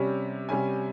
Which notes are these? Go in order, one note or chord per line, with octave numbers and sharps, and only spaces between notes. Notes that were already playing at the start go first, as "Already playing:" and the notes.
Already playing: C3 G3 C#4
C3 G3 C#4 G#5